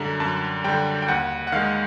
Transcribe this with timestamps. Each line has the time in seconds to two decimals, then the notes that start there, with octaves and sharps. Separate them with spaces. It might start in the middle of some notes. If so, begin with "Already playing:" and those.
Already playing: F#2 D3 G3 A#5
0.20 F#2 A5
0.64 D3 G3 G5
1.02 G5
1.08 D#2 F#5
1.47 F#5
1.52 D#3 G#3 F5